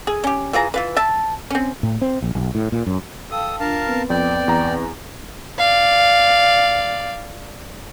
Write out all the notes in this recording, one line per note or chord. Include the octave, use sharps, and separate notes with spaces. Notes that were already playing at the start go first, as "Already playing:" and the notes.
G#4
C#4 G4
E3 F4 G#4 A#5
E3 F4 B4
E5 A5
C4 C#4
A2
C4
A#1
B1
A2
A#2
F#2
A4 F5 G5 A5 D#6
D4 F4 A#4 F5 A5
B3 C4 B4
F2 D5 G5
E2 A#5
D5 F5